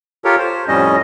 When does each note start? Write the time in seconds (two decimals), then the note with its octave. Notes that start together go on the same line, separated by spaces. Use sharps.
0.25 F4 G4 A4 A#4 C#5
0.39 C5
0.68 F2 A2 G3 C#4 D#5